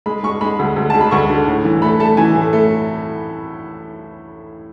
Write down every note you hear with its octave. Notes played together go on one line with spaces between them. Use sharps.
G#3 B5
G#3 C#6
G#3 B5
D2
D2
G#3 A5
B5
D2 C#6
D3
A2
E3
A3 B5
A3 A5
E3 G#5
A2
A3